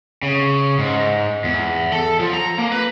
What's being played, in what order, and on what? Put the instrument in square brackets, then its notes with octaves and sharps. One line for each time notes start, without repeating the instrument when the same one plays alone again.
[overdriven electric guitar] C#3
G#2
E2
A4
F3
A#5
A#3
B4